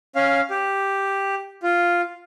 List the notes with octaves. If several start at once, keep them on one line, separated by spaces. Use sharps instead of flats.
C#4 F5
G4
F4